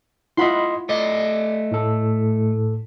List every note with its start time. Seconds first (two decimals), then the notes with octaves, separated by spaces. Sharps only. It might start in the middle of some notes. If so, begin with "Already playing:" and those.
0.37 E4 F4 D#5 F#5 B5 C6
0.89 A3 D5 D#5
1.71 A2 A4